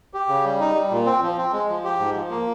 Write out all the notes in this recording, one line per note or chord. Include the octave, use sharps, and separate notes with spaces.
G4
C#3
G3
D#4
G3
A#2
C4
F3
C4
G#3
F3
G4
G#2
F3
A#3